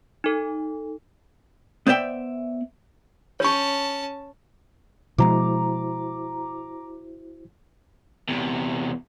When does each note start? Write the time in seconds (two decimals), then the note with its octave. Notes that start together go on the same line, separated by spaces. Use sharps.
0.24 D#4 A4
1.87 B3 C5 D5 E5 G5
3.40 C#4 C#5 A5 C#6
5.18 B2 F3 G#3 E4 F#4 C5 A#5 D6
8.29 E2 C3